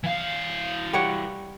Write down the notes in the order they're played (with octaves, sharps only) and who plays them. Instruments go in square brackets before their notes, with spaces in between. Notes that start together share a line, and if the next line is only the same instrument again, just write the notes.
[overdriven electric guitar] E3 F5
[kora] G3 C#5 F#5